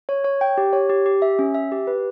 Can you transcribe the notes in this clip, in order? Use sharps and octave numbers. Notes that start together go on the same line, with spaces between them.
C#5
C#5
G5
G4
C#5
G4
G4
E5
C#4
E5
G4
B4